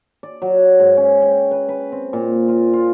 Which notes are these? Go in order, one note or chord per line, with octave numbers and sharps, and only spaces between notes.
D5
F#3
G#2
C#4
G5
B4
B4
C4
A#2
F4
F4